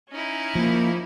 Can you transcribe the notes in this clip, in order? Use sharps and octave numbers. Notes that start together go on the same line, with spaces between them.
C#4 D#4 E4
F3 A#3